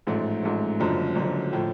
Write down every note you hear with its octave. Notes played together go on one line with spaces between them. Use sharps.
A1 G#2 F3 A3
A1 G#2 F3 A3
F#1 F#2 D3 F3
F#1 F#2 D3 F3
A2 F3 A3